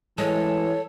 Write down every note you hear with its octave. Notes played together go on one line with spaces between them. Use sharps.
E3 G#3 A4 C#5